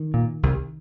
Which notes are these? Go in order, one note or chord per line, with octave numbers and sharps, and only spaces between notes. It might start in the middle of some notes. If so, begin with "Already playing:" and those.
Already playing: D#3
A#2
C2